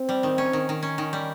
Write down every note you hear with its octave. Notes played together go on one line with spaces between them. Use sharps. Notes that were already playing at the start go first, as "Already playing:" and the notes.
Already playing: C4
G3
D#3
C#4
D#3
D#3
C#4
D#3
G3